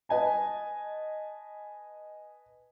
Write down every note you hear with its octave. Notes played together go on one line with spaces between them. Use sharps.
B4 D#5 G#5 A5